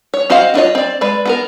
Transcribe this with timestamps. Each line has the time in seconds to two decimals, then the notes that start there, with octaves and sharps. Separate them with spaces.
0.14 C#5
0.30 C4 F#4 C5 D#5 F5
0.54 B3 D4 F4 C#5 D#5
0.75 C4 D5
1.01 G#3 B4 D5
1.25 B3 A4 A#4